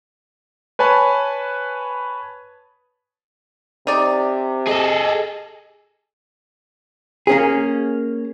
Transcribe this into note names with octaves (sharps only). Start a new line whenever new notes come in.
B4 C#5 G#5 A5 B5
C3 D#4 D5
G#4 A4 D#5
A#3 C#4 G#4